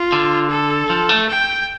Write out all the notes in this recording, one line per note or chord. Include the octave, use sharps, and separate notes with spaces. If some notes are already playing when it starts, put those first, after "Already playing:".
Already playing: F4
D3
A4
F3
A3
G5